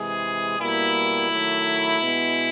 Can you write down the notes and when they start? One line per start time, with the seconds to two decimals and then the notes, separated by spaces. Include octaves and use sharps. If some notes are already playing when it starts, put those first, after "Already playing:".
Already playing: C3 E3 G#3 G#4
0.60 B2 G3 A#3 E4
1.31 D#3 F#3 A3
2.01 B2 G#3 B3